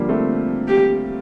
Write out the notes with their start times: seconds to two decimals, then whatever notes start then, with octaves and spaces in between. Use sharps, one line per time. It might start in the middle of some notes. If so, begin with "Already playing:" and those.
Already playing: D3 F3 G3 A#3
0.09 A3 C4
0.68 G4